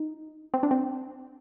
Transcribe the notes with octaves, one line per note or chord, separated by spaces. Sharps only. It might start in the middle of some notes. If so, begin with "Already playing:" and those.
Already playing: D#4
C4
D4
C4